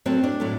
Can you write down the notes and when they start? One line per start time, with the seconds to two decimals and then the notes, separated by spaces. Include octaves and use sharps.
0.06 F#2 F#3 A3 C4
0.24 D4
0.40 A2 F#3 A3